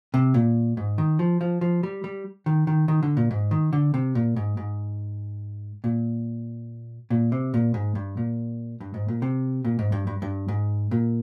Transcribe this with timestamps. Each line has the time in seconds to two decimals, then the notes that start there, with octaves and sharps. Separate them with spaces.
0.14 C3
0.34 A#2
0.77 G#2
0.98 D#3
1.19 F3
1.41 F3
1.61 F3
1.83 G3
2.04 G3
2.46 D#3
2.67 D#3
2.88 D#3
3.03 D3
3.17 A#2
3.31 G#2
3.51 D#3
3.73 D3
3.94 C3
4.15 A#2
4.36 G#2
4.57 G#2
5.84 A#2
7.10 A#2
7.32 C3
7.54 A#2
7.74 G#2
7.95 G2
8.17 A#2
8.80 G2
8.94 G#2
9.08 A#2
9.22 C3
9.65 A#2
9.79 G#2
9.92 G2
10.07 G2
10.22 G2
10.48 G#2
10.91 A#2